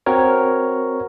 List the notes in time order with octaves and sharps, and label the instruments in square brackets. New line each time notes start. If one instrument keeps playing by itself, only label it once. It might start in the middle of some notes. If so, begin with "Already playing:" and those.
[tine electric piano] C4 F#4 A#4 C#5